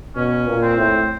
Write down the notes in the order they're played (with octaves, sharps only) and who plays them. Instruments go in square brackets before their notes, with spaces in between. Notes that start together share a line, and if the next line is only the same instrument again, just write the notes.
[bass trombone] B2 [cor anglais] C#4
[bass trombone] A#2
[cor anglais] C4
[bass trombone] A2